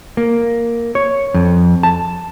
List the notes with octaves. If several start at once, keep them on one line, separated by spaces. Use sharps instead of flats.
A#3
C#5
F2
A5